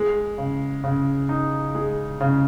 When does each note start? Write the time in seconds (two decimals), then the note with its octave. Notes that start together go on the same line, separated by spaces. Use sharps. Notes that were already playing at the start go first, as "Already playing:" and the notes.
Already playing: G#3
0.38 C#3
0.84 C#3
1.29 D#4
1.75 G#3
2.21 C#3